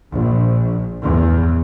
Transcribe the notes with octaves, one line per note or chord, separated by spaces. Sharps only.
A#1
E2